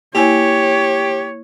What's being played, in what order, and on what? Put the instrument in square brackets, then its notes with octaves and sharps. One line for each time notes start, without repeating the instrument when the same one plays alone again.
[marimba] A#3 E4 G#5 [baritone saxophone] G4 [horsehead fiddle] C#5